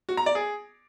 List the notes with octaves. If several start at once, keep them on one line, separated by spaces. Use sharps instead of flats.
F#4
A#5
D5
G#4